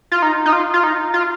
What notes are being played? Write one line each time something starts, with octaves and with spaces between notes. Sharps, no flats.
F4
D#4
D#4
F4
F4
D#4
F4